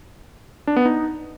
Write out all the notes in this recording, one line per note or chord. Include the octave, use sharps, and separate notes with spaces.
D4
B3
D#4